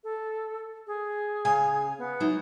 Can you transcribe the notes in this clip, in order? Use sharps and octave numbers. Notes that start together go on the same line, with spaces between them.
A4
G#4
C#3 F5 G#5
B3
F#3 D#4 E4